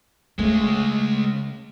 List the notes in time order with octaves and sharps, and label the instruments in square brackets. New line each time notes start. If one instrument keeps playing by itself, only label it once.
[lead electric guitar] C#3 G#3 [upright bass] A3